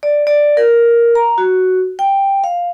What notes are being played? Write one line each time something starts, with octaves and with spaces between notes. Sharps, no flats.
D5
D5
A#4
A#5
F#4
G5
F5